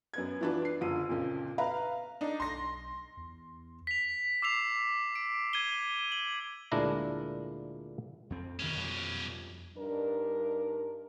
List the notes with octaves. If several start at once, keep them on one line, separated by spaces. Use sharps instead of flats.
F#2 B3 G#6
E3 F3 D4 F#4 B4
D4 C7
F#1 D3 F3 D#7
F2 A#2 C#3 F3
B4 E5 F5 A#5 B5
D4 D#4
B1 C6 A#6
E2
B6 F7
D6 E6 C7 F7
D7
G#6 D#7 G7
F#7
D2 A#2 G#3 D4 E4 A#5
F2 C4
D2 G2 B2 D#3 C#4
F2 F3 G3
G2 D4 D#4 A#4